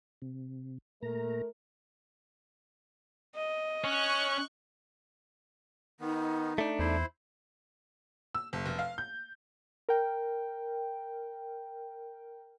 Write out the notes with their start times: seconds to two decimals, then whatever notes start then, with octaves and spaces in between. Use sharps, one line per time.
0.22 C3
1.03 A#2 A3 A#4 A#5
3.35 D#5
3.84 C#4 C#6 F#6
6.00 D#3 B3 D#4
6.58 A3 D4
6.79 E2 E4 C5
8.35 E6
8.53 F#1
8.66 F1
8.79 F5
8.98 G6
9.89 A#4 G5